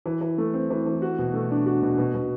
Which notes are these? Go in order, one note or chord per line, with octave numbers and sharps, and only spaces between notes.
E3
E3
A3
C4
E3
E3
F#4
B2
A3
D4
F#4
B2
B2
B2